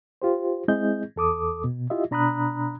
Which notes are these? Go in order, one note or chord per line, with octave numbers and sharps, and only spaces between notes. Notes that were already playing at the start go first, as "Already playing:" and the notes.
F4 G4 C5
G#3 C4 E4 G#4 D#5 G6
E2 A4 D6 D#6
B2
E4 F4 G4 D#5 E5
B2 D4 A#5 B5 D#6 F#6